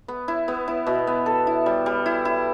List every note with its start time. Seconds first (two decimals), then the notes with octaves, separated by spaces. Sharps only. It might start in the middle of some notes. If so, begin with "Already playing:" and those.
0.08 B3
0.28 E4
0.48 B3
0.68 E4
0.87 B2
1.07 B3
1.26 A4
1.47 E4
1.66 G3
1.86 G3
2.06 E4
2.25 E4